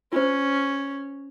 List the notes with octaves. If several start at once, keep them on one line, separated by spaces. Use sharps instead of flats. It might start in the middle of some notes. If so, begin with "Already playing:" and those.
C#4 F4 C5